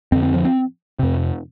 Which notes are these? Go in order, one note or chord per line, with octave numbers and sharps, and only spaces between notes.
F2 D3 C4
C4
F3
C4
F2 C3